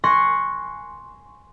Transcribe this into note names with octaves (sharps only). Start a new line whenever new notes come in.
G#5 C6 C#6 F#6 A#6